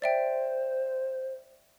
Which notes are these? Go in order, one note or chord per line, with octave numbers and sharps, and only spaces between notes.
C5 D5 E5 G5